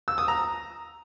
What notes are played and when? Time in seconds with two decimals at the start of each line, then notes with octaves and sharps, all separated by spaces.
0.08 E6
0.18 D#6
0.28 A#5